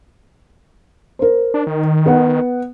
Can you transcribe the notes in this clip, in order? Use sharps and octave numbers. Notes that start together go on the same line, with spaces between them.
A#4 C5
D4
D#3
B3 F#5